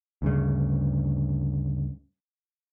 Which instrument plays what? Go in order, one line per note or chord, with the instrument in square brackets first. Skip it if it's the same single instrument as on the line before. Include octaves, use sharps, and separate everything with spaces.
[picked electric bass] D2 G2 C#3